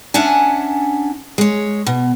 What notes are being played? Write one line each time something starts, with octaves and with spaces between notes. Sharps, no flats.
C#4 D4 E5 F#5 G#5
G#3 C#5
B2